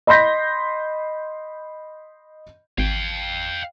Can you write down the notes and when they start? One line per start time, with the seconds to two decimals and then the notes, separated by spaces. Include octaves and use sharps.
0.07 D#5 B5 C6 G6 A#6 B6
2.78 G#1 F5 G5